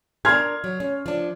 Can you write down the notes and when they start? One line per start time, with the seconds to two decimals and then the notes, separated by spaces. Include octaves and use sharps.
0.25 D4 A#4 C6 F6 G#6
0.64 F#3
0.80 C#4
1.06 F3 D4